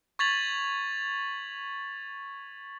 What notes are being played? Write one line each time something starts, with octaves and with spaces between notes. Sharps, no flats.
C#6 G#6 A6 B6 F7 F#7